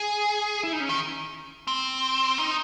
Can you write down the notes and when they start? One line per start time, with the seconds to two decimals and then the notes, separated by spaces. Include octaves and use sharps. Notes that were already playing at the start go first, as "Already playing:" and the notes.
Already playing: G#4
0.63 E4
0.73 D#4
0.80 C#4
0.89 D#3
1.67 C4
2.38 D#4